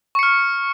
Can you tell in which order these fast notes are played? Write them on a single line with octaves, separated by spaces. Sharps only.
C#6 C#7 F6